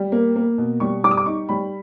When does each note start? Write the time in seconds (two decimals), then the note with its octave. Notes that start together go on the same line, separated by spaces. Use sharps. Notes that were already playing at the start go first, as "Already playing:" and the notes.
Already playing: G3
0.12 A#3
0.36 A#3
0.58 B2
0.80 G3 C#6
1.04 G3 D6
1.11 D#6
1.17 D6
1.26 D#4 C#6
1.49 G3 B5